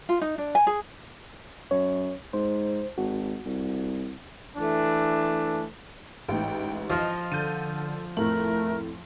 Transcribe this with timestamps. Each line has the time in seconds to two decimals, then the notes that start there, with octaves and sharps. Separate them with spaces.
0.09 F4
0.21 D#4
0.38 D4
0.55 G#5
0.67 G#4
1.71 F#2 C#5
2.33 G#2 C5
2.98 G#1 F#4
3.46 C2
4.57 E3 A3 D4
6.29 A1 G#2 G5
6.90 F3 D#5
7.32 D3 A4 G6 A6 D#7
8.17 F2 A2 A3 A#4 F#7